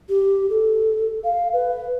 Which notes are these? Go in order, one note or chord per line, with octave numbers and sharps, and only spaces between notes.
G4
A4
F5
B4